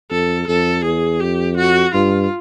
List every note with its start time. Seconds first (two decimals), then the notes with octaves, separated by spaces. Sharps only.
0.11 F2 A4
0.47 F2 A4
0.84 E2 G#4
1.20 F2 G4
1.57 F#4
1.94 G2 F4